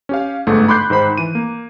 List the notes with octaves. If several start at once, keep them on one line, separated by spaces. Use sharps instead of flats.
C#4 G4 F5
G1 G#2 A3
B5 C6 D6 F#6 G6 C7
G#2 D#3 C5 B5
E3 D#7
A#3